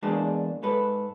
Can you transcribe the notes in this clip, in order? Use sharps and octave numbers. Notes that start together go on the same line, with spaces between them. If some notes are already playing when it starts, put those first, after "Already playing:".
E2 G#3 A#3 D4 G#4 A5
G#2 A4 B4